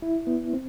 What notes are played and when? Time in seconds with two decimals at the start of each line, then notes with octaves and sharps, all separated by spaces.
0.02 E4
0.27 B3
0.53 C4